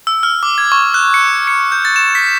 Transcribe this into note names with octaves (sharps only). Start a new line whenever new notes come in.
E6
F6
D6
G#6
C#6
F#6
C#7
C#7
G6
A6
E7
B6